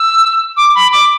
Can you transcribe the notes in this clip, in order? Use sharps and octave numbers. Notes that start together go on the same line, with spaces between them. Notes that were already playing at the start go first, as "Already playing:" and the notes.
Already playing: E6
D6
B5
D6